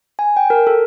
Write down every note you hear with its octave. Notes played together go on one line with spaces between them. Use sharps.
G#5
G5
A#4
A4